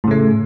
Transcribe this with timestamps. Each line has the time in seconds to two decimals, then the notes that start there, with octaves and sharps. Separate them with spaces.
0.04 A2
0.07 C#3
0.11 A3